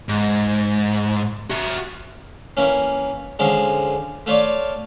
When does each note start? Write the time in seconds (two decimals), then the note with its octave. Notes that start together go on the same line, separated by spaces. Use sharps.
0.09 G#2
1.50 F#4 E5
2.57 E3 A#3 C#4
3.39 D3 F3 G#3 C#4
4.26 A3 F4 C#5 D5